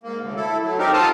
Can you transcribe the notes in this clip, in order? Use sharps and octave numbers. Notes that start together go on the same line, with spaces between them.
G#2 A#3
D2 C#3
E4 A4
F#3 A3
C4 D#4 G4 A#4
F4 A4 F5 A5 D#6 F6